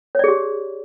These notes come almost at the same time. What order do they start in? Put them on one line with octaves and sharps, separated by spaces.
C#5 D5 G#4 G4